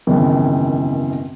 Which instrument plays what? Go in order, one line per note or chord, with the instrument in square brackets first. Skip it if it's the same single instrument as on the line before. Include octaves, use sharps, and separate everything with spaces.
[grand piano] G#1 C#2 F#2 B2 D#3 E3